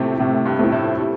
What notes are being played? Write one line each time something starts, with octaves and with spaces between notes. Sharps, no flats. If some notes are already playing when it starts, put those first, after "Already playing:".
Already playing: A2 C3 A3 C4 E4
A2 C3
G2
A3 C4 E4
A2
G3